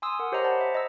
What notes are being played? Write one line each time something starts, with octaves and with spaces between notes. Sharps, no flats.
G#5 C6 D#6 E6
A#4 F#5
G4 C5 C#5 D#5 A#5
C5 D5 F#5 A5 B5
E5
D#5 A#5 E6